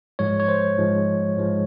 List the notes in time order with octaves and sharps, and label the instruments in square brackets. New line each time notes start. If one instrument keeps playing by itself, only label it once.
[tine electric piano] G#2 F3 G#3 C#5
C#5
C5
G#2 F3 G#3
G#2 F3 G#3